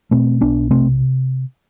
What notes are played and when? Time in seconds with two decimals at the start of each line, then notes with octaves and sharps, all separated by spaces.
0.11 B2 A3 C4
0.41 B1 B3 D4
0.70 C3 A3 C4